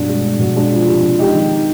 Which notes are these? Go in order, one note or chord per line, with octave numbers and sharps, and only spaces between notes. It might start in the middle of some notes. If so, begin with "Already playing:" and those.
Already playing: G2 B2 D4
G#3
G#3
B2
G#3 D4
F3
C3
C3
G#3 D#4 G4
D#3